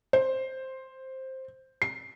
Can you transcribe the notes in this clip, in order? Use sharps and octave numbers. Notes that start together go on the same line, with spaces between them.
C5
C7